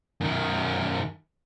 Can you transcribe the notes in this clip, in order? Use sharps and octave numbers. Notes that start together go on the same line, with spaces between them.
F#2 D#3